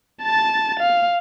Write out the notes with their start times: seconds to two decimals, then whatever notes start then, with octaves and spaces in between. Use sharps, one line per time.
0.23 A5 A6
0.80 F5